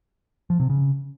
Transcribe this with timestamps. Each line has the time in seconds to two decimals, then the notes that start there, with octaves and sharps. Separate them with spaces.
0.50 F3
0.60 C3
0.70 C#3